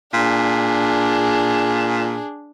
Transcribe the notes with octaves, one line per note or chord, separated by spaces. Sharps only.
A#2 D4 G#4